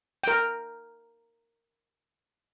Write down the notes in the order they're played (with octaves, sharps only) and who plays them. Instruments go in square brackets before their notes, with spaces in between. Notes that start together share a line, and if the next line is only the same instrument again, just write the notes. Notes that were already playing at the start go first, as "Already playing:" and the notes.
[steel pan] A#4 G5